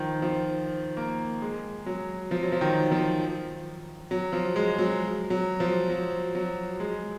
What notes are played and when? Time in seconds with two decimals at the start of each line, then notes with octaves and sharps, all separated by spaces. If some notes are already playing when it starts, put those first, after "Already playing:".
Already playing: D#3 F3
0.22 F3
0.97 A#3
1.42 G#3
1.86 F#3
2.31 F3
2.43 F#3
2.52 F3
2.61 D#3
2.92 F3
4.11 F#3
4.33 F3
4.56 G#3
4.78 F#3
5.30 F#3
5.60 F3
5.90 F#3
6.35 F#3
6.80 G#3